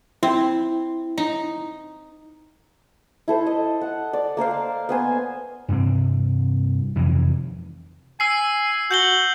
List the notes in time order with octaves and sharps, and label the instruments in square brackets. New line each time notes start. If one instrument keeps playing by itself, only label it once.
[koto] C4 [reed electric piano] E4
[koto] D#4
[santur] E4 A4 C5
D#5
F#5
D5
A#3 A#4 C5 F5
B3 C5 G#5
[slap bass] G2 C3 C4
F2 C3 D#3 E3
[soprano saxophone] G#5 [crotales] E6 C7
[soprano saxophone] F#4 [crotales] G6 F#7 G7